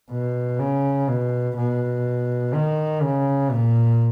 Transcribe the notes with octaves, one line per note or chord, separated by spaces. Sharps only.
B2
C#3
B2
B2
D#3
C#3
A#2